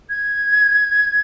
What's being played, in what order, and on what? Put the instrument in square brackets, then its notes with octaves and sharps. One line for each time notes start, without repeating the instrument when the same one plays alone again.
[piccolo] G#6